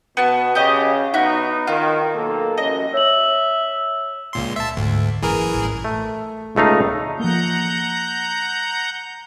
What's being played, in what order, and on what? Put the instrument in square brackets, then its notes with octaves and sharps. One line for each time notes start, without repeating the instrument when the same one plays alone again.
[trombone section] B2 [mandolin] B3 A5
[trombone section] C#3 [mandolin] G4 D#5
[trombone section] B3 D#4 [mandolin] F#4 E5 F#6
[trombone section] D#3 [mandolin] F4
[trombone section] B1 A#3 A4
[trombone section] A1 F#2 [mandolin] D#5
[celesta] C#5 F#7 [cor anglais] E5
[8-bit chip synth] C#2 A#2 C6
E5 A5
[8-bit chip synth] D2 [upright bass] G#2
[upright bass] F#1 [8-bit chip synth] E3 G#4 A#4
[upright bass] A1 G3
[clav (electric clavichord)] A3
C#2 A3 D#4 F5
[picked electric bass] F3 A#3 [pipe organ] F#5 A#5 G6